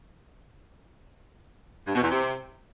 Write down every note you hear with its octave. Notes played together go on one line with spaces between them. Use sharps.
G2
B2
E2
C3